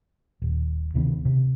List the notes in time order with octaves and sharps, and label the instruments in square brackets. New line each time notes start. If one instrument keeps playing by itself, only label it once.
[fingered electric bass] D#1
D2 C3 D#3 B3
C3